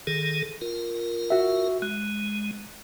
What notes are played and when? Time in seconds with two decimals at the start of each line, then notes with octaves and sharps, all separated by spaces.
0.07 D#3 G#4 A4
0.61 F4 A#4
1.30 F#4 E5
1.82 G#3 F#6